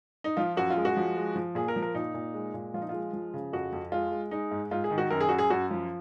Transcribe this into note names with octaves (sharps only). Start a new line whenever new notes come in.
D#4
F3 F4
F#2 F#4
F4
G#3
F#4
F3
G#3
F3
A#2 G#4
A#4
F3
A#4
A#2 D#4
A#2
G#3
A#2
F3 F4
D#4
G#3 F4
F3
C#3
F2 F#4
F2
G#3 F4
G#3
G#3 D#4
G#2
G#2 F4
G#4
D#3
F#4
F#2 A#4
G#4
F#2 F#4
G#4
F#2 F#4
F3